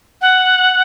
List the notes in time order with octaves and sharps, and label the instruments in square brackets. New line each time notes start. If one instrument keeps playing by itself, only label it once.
[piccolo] F#5